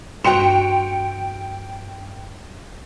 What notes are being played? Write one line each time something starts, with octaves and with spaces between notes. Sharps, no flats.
G2 F#4 G5 C6 C#7 F7